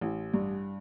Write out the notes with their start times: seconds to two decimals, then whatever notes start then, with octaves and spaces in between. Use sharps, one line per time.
0.01 A1
0.34 G2